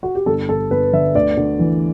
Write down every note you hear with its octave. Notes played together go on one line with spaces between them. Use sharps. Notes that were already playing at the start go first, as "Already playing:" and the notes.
F#4
G4
G1 A4
G1 A4
G1 B4
D3 E5
D2 D5
D2
E3